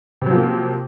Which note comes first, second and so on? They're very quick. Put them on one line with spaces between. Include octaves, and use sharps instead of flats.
C3 F#3 F3 A#3